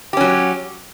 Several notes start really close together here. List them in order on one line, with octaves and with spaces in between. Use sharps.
G4 C#4 F#3